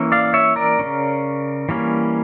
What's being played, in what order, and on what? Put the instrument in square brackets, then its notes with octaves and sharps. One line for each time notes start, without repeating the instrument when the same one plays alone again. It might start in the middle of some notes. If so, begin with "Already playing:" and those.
Already playing: [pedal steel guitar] E3 A#3 C#4
D5 F5
C#5 E5
A#4 D5
C#3 F3 C#4
E3 G3 A#3 C#4